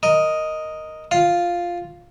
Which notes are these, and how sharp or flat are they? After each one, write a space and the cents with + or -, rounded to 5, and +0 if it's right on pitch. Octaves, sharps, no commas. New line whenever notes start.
A#4 +0 D#5 +0
F4 +0 F5 +0